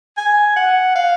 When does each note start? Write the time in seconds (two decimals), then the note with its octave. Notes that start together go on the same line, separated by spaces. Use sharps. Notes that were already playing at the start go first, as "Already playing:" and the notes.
0.17 G#5
0.56 F#5
0.95 F5